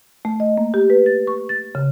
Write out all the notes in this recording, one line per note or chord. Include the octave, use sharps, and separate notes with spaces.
A3
D#5
A#3
G4
B4
A6
C#6
A6
C#3